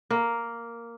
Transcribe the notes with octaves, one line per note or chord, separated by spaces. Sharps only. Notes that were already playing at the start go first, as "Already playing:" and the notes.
A#3